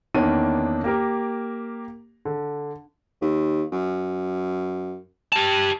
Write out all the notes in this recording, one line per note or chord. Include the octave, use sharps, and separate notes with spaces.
E2 D#3 A#3 C#4 D4 D#7
A#3 G4 A#4
D3
D#2
F#2
G4 A5